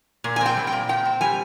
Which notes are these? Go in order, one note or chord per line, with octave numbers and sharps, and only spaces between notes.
A#2
G#5
C4 G5
G3
G5
A#2
A#2 G5
C4
G3 G#5